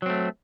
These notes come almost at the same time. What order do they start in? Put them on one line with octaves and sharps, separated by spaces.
F#3 C4 A3